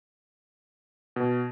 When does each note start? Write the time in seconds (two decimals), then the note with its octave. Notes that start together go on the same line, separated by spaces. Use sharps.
1.16 B2